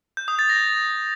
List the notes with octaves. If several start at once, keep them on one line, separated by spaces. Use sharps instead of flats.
G6
D#6
A6
A#6